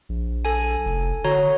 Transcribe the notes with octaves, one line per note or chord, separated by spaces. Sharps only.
A#1
A4 G#5
F1
D3 F#4 C#5 A#5